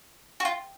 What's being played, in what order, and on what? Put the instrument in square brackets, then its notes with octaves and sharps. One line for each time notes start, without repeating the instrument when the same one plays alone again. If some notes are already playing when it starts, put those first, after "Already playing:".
[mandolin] F#4
F4